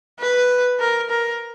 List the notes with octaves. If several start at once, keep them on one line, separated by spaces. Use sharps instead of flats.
B4
A#4
A#4